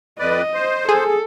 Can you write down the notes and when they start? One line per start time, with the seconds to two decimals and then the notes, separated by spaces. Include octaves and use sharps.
0.19 F2 B4 D5 D#5
0.54 C5
0.89 G#4 A4